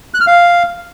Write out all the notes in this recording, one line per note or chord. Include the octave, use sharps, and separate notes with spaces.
F#6
F6
F5